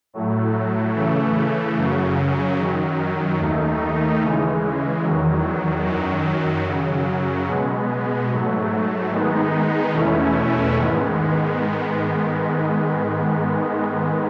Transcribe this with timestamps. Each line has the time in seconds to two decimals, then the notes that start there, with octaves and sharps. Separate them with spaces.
0.13 A2 F#3 A3
0.95 C#3 E3 A3
1.76 F#2 C#3 F#3
2.58 F#2 D#3 F#3
3.39 D#2 D#3 A3 D#4
4.21 C#3 E3 G#3
5.03 E2 D#3 F#3
5.84 F#2 D#3 F#3
6.66 F#2 C#3 F#3
7.48 B2 G#3 B3
8.29 G#2 F#3 A3
9.11 D#3 G#3 B3 D#4
9.93 E2 B2 A3 C#4 E4
10.74 G#2 D#3 G#3 B3